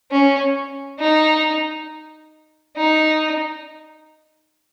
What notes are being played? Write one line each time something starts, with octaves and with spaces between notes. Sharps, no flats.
C#4
D#4
D#4